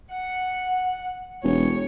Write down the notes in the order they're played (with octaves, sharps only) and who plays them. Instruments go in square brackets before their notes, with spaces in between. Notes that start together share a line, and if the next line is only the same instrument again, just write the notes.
[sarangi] F#5
[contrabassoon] E1 [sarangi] C#5